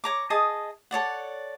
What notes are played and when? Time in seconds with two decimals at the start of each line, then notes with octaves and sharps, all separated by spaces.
0.04 C#5 A#5 D6
0.30 G#4 D#5 A5 D#6
0.91 A4 C#5 D5 F#5